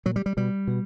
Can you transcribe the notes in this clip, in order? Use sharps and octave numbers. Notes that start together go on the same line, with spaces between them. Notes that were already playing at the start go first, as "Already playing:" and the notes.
A#2 F#3
G3
G3
B2 G3
B2